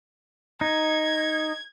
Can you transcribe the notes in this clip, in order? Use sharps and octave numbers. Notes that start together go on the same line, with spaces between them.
D#4 G#6